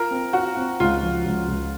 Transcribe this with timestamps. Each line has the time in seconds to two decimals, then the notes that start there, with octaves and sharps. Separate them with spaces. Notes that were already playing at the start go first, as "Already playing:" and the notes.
Already playing: F4 A#4
0.11 C4
0.33 F4 F#4
0.57 C4
0.80 C#2 F4
1.02 F3
1.25 C#2
1.48 C#2